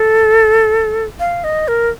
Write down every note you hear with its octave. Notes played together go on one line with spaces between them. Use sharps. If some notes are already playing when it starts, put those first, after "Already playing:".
Already playing: A4
F5
D#5
A#4